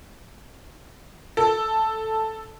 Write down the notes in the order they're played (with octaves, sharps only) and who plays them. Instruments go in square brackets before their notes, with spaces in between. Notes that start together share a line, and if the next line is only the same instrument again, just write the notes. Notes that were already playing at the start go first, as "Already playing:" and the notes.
[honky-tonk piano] A4